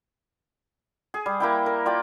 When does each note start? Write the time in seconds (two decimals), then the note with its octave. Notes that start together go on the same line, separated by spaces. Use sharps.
1.14 G#4
1.26 G3
1.40 A#3 E4 G5
1.66 A#4
1.86 F4 D5 G5